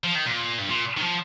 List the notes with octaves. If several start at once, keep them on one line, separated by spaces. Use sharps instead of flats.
F3
D#3
A#2
G2
A#2
D#3
F3